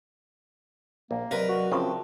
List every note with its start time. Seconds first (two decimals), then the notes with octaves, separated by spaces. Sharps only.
1.11 A#1 A#3
1.31 C3 F#3 A#4 B4 D5 D#5
1.49 F#4
1.72 C#3 F3 C4 E5 G5 A5